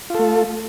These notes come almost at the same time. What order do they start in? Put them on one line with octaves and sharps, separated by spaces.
F4 A4 A3